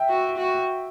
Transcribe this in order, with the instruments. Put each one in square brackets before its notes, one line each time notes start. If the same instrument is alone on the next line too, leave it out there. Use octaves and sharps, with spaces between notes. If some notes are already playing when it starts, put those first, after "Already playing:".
Already playing: [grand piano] E5 G5
[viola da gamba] F#4
F#4